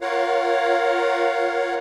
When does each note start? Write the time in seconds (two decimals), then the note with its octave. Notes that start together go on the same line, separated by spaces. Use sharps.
0.01 F4 A#4 C#5 F5 F#5